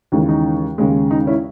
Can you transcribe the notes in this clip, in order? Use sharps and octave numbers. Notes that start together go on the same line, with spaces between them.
D#2 C#3 E3 G#3 D#4
D#4
D#2 C#3 G#3
D#4
C#4 E4